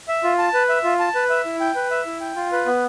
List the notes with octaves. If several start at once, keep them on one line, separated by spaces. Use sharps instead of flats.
E5
F4
A5
B4
E5
F4
A5
B4
E5
E4
G5
B4
E5
E4
G5
F4
B4
B3